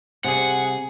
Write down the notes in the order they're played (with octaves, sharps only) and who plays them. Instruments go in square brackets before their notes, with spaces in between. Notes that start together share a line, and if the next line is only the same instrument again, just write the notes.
[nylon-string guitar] C3 G3 [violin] G#4 [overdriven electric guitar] F#5